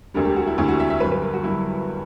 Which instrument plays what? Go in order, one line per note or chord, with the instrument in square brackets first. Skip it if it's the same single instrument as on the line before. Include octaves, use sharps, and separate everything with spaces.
[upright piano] E1 D2 D3 G3 A#4
G4
F#4
E4
E1 D2 D3 G3 E4
F#4
E5
E5
F#3 B4
G1 G2
B4
A#4
F#4
G1 G2 F#3 E4